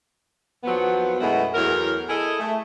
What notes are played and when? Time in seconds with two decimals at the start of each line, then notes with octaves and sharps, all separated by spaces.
0.64 D#2 F3 F#3 B3
1.20 F#2 B2 G#3 A3 E4 F#4
1.54 E2 A2 F#3 A#4
2.09 E4 G#4 A4 D#5
2.39 A3